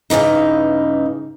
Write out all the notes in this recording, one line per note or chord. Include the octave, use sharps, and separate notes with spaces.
G2 C#3 E3 D#4